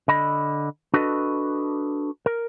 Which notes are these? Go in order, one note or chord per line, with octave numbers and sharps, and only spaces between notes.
D3 D#5 B5
D4 F#4 A4 B4 D#5
A#4